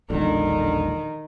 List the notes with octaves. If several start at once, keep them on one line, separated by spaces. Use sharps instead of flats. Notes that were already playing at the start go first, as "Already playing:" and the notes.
E1 A#1 D3 D#3